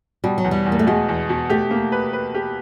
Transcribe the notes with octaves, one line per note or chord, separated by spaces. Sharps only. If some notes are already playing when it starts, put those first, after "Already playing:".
B2 G3
F#3
E2
G3
E2
A#3
A3
B2 G#3
E2
B2
A3 G4
A#3
B4
B4
G4